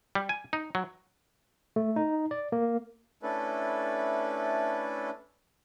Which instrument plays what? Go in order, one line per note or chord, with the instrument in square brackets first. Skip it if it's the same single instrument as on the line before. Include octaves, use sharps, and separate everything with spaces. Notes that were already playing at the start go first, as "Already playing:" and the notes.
[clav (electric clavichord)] G3
G#5
D#4
F#3
[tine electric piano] A3
D#4
D5
A#3
[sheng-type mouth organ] A3 C#4 D4 E4 A4 B4